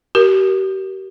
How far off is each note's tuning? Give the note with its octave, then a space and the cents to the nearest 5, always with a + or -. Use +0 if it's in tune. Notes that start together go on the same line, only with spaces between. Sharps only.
G4 -40 A#4 +10